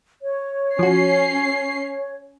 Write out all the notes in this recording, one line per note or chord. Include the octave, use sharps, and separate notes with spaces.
C#5
F3 C#4 F#4 C7